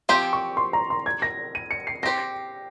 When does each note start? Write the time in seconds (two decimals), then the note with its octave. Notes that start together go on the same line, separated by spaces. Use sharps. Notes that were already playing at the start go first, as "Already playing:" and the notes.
0.09 F3 C4 G4 C6
0.33 C#6
0.57 C6
0.73 A#5
0.90 C6
1.06 G#6
1.22 A#6
1.55 D#7
1.71 C#7
1.87 C7
2.03 C4 G4 C5 A#6